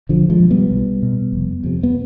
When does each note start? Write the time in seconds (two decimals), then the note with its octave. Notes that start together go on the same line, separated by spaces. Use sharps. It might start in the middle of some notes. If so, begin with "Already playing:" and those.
0.09 B1 D3 F3
0.30 F3 G#3
0.40 B2
0.51 G3 B3
0.71 B1
1.02 B2
1.33 F1
1.64 F2 C3
1.83 B3